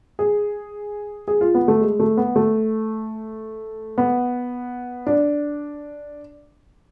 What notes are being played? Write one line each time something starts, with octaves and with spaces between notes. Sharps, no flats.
G#4
G#4
F4
B3
A3
G#3
A3
B3
A3
B3
D4